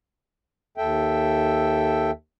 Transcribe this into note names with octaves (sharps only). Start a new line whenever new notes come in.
D#2 A4 E5 G5